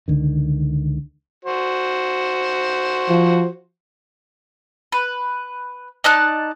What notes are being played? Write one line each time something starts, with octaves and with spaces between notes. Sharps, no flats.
C#2 D3 D#3
F#4 C5
F3
B4
D#4 D5 A5 F#6